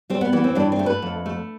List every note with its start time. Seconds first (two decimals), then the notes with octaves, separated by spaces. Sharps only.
0.10 G3 C4
0.21 B3
0.33 E3 B3
0.44 C4
0.55 G2 D4
0.72 C4
0.79 A3
0.86 B4
1.02 F2
1.26 A3